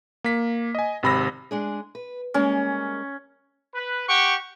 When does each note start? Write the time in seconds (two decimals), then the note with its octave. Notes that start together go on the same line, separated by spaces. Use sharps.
0.24 A#3 B6
0.75 D#5 G#5
1.03 G#1 C3 B5 E6 A#6
1.51 G#3 D4 G#4
1.95 B4
2.34 G3 G#3 A#3 C#4
3.75 B4
4.09 G4 F#5 G5 C#6